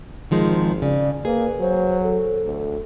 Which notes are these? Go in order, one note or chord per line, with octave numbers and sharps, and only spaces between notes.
G#1 D#3 F3 G#3
C#3 D5
A#3 G#4 B4
F#3 C5
A4
D2